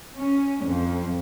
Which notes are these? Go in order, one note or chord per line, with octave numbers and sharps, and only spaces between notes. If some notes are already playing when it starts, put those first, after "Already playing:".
C#4
F2